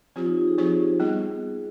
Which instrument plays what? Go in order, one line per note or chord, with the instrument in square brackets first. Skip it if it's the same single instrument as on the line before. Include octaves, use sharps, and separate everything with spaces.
[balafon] F3 C4 G4 C5 [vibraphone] F4
[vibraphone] D#4
F4
G#4
[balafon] F3 C4 G4 C5 [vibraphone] G#4
[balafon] G3 B3 [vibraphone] G#4